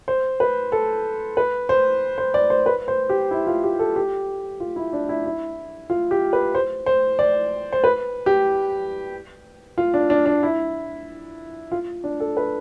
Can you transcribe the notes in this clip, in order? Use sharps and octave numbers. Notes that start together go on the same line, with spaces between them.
C5
B4
A4
B4
C5
C5
D5
C5
B4
C5
G4
E4
F4
G4
A4
G4
F4
E4
D4
E4
E4
F4
G4
B4
C5
C5
D5
C5
B4
G4
F4
D4
D4
D4
E4
F4
D4
A4
B4